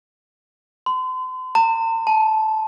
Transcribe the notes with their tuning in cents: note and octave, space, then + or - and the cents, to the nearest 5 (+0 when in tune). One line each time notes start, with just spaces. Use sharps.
C6 -40
A#5 -45
A5 -15